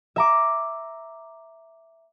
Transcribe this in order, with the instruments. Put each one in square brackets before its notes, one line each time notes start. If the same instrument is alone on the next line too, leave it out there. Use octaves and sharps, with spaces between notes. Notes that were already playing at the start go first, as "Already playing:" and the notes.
[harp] E5 A#5 D6